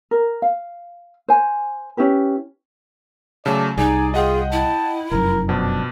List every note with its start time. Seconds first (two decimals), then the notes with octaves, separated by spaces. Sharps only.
0.11 A#4
0.42 F5
1.28 C5 G#5
1.97 C#4 E4 G4 B4
3.46 C#3 F#3 A3 D5 A5
3.78 C2 D#4 G#4 D5 G#5
4.14 F4 G#4 D#5 F#5 G5
4.52 E4 A5
5.12 F1 F#2 A#4
5.49 F2 B2 D4